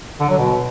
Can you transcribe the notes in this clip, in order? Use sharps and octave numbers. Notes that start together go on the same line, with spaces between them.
D3
F#3
B2